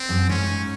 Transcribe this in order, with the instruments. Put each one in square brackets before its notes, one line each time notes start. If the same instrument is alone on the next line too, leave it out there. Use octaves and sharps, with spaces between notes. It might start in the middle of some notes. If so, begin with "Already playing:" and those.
Already playing: [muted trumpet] C4
[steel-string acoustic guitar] F#2
[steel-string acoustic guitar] G#2 [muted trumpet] C#4